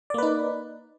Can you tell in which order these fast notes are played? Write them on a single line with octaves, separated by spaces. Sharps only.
D5 A#3 B4 D#4